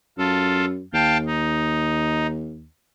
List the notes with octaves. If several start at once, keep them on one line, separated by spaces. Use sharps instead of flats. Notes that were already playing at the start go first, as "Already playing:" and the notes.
F#2 F4 A4
D#2 F5 G5 A5
D#4